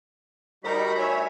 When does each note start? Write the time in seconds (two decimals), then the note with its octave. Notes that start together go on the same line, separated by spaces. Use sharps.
0.64 D2 G3 D#4 F#4 A#4 B5
0.98 C#5 E5 G#5